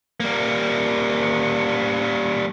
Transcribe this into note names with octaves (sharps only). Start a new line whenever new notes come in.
G3 A#3